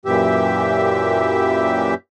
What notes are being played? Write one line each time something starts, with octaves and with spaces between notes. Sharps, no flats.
F#2 A#2 E3 G4 E5